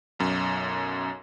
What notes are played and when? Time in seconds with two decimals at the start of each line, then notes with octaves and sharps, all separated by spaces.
0.19 B1 F#2